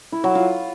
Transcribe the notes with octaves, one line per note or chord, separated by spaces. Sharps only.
E4
F#3
F4